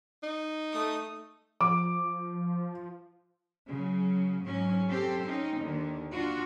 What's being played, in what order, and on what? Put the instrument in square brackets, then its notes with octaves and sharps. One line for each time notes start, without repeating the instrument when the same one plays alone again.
[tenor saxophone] D#4
[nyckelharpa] A3 D#6
[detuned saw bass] F3 [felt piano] D6
[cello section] C#3 F#3
G#2 F#3 C#4
C4 G4 A4 C5
C4 C#4 D#4
D#2 D3 D#3
D4 F4 F#4